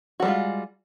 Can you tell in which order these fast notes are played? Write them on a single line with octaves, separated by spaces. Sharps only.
F#4 G3 G#3 F4